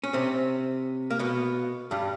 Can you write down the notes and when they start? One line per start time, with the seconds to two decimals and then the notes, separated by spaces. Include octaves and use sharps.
0.04 C#4
0.13 C3 C4
1.10 A#3
1.19 B2 B3
1.91 G2 G3